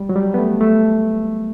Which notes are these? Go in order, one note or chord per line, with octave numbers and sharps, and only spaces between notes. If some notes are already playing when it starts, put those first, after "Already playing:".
Already playing: G3
F#3
G3
B3
A3
A3